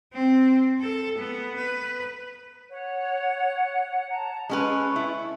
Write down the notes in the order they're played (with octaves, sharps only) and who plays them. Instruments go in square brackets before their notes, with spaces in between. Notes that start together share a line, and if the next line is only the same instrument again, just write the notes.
[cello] C4
A4
B3
B4
[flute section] C#5 F#5
A5 A#5
[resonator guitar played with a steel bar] G#3 C#4 B4 [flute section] A4 C#6
[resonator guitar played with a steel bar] E4